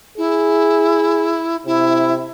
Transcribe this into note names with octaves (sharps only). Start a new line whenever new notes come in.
E4 G#4
C3 E4